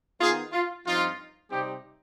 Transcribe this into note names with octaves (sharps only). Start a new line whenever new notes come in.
D#3 B3 D#4 F4 G#4
F4
G2 F3 C4 D#4 F4
C3 G3 C4 D#4 G4